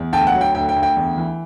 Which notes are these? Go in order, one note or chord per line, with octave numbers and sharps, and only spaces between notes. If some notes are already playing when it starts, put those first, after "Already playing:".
Already playing: E2
D2 G5 A5
F#5
F#3
G5
D2 G5
G5
D2
G5
E2
E3